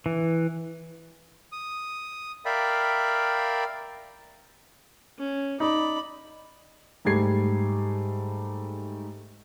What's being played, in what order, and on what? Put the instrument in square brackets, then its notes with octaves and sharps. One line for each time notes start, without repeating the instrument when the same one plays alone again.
[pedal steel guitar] E3
[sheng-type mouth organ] D#6
A#4 D5 E5 F5 G5 B5
[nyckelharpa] C#4
[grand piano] D#4 [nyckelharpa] D5 B5
[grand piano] G#2 G3 A3 G4 G#6 C7